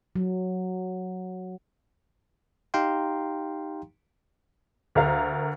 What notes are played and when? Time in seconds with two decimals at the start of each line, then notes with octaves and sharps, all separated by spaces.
0.16 F#3
2.74 D#4 G4 F5 G5 A#5 C6
4.95 D2 A#4 F5 A#5